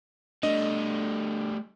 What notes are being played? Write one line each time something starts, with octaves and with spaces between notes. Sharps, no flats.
G3 A3 D4 D#5